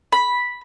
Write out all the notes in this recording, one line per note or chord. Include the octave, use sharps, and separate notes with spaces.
B5